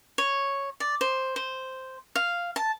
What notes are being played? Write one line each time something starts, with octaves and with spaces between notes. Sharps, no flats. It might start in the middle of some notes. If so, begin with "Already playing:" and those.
C#5
D5
C5
C5
F5
A5